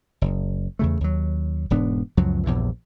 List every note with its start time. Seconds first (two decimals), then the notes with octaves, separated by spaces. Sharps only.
0.21 F#1
0.79 E2 C#3 A3
1.01 D#2 F#3
1.70 E1 G#2 B3 D4
2.17 C#2 F#2 F3 F#3
2.44 A#1 E2 G2 E3